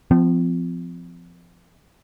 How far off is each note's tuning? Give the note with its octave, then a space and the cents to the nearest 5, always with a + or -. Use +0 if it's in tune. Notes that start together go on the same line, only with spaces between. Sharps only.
F3 -5 C4 -40